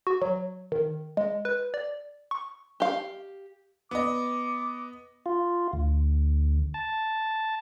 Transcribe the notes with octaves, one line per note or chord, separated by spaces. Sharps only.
F#4
F#3
D#3
G#3
B4
D5
C#6
G4 F5
B3 D#5 D6
F4
D2
A5